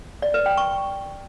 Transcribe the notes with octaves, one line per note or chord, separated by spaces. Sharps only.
D5
B4
G5
C#6